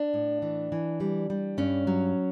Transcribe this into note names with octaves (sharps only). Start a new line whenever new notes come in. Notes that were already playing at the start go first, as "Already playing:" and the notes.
Already playing: D4
A2
E3
E3
G3
G3
G2 C#4
F#3